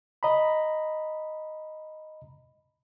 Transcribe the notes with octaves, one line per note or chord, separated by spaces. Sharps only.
D#5 A#5 B5